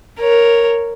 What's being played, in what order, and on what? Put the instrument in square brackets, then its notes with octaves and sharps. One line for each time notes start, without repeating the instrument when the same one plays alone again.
[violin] A#4 C#5